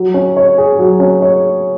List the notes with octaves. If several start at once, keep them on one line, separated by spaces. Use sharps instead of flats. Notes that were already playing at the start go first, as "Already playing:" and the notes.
Already playing: F#3
C#4
C#5
G#4
F#3
C#4
C#5